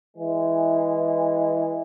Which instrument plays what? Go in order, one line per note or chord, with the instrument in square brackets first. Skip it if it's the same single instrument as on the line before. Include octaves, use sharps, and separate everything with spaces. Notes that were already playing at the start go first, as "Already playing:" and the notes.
[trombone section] E3 G#3